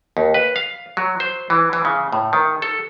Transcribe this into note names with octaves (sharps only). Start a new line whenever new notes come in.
D#2
B4
F5
F#3
C5
E3
E3
C#3
A2
D#3
A4